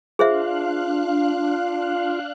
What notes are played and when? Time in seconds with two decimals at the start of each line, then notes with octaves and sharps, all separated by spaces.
0.19 D4 F4 G#4 C5 E5 F5 F#6